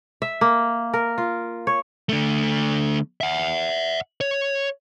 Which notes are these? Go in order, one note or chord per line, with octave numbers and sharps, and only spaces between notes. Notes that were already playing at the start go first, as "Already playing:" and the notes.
E5
A#3
A#4
F4
C#5
D3 A3
E5 F#5
C#5